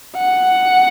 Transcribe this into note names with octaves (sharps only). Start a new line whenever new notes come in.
F#5